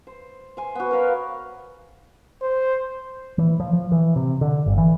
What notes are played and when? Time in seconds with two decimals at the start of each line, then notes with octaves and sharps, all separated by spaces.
0.07 C5
0.57 C5 G#5
0.75 B3 F#4
0.91 A#4 C#5 F5 B5
2.42 C5
3.38 E3
3.60 F3
3.73 F3
3.92 E3
4.16 C3
4.41 D3
4.66 G1
4.78 E3